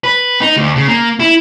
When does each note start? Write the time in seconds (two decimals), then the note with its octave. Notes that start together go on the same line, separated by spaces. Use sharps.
0.04 B4
0.41 D#4
0.56 D2
0.76 C#3
0.88 A#3
1.20 E4